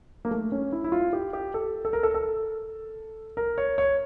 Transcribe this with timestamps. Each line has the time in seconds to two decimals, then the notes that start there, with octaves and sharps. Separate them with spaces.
0.25 A#3
0.31 A3
0.52 C#4
0.72 E4
0.84 E4
0.92 F4
1.13 G4
1.33 G4
1.54 A4
1.85 A4
1.93 A#4
2.03 A4
2.14 A4
3.37 A#4
3.58 C#5
3.78 C#5